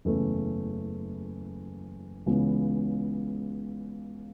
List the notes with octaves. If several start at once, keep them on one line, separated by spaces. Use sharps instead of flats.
F#1 E2 C#3 A3
C#2 C#3 E3 B3